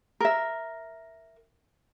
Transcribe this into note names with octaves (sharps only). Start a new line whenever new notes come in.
A#4 E5